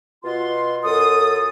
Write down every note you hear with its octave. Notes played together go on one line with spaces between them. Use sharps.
B2 F4 C6
F#2 A4 D#6